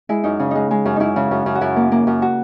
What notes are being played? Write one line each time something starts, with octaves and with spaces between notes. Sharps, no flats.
G#3 E4
F#2 D#4
C#3
G#3 D#4
G#3
F#2
F#2 D#4 E4
C#3
F#2
F#2
F#4
F#2 E4
A#3
A#3
F#2
F#4